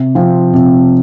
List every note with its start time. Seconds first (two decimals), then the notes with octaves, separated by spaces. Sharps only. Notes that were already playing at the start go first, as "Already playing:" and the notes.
Already playing: C3
0.15 F3 C4 F4
0.53 C3